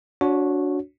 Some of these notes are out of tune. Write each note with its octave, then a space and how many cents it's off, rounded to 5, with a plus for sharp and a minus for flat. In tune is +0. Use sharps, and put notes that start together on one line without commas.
D4 -25 F#4 -15 C#5 +0